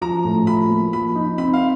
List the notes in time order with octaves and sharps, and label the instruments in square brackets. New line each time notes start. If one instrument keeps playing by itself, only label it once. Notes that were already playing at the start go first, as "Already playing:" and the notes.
[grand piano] F3 [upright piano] A#5
[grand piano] A2
[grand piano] F3 [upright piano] B5
[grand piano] A#3
[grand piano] F3 [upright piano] B5
[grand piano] D#4
[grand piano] C4 [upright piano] B5
[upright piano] F5